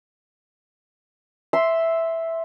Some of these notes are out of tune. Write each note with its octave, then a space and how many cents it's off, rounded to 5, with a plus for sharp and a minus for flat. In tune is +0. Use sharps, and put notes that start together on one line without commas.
E5 +0 C6 +0